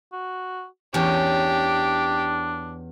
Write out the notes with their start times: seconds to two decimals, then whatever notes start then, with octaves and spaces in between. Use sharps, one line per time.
0.13 F#4
0.94 E2 C#4 D4 G4